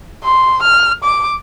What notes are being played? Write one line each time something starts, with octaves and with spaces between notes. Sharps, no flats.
C6
F6
D6